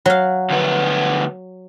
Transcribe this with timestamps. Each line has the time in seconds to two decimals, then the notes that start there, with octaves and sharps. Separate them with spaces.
0.06 F#3 F5
0.50 D2 B3